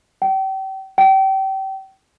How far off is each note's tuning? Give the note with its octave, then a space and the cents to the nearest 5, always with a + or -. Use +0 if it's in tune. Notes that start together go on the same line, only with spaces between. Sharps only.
G5 -35
G5 -30